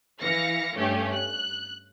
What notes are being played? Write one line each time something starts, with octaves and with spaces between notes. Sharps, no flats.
E3 F5 A#6 C#7
G2 A3 C#4 G4
F#6